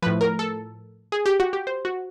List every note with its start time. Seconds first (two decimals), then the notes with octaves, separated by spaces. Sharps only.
0.02 F3 B4
0.06 A2
0.21 A#4
0.39 A4
1.12 G#4
1.26 G4
1.40 F#4
1.53 G4
1.67 C5
1.85 F#4